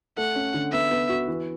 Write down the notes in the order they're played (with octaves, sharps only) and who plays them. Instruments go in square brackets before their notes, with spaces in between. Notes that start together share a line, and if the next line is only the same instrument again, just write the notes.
[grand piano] A3 [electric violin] F#5
[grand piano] C#4
D3
[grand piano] B3 [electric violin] E5
[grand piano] B3
F#4
E3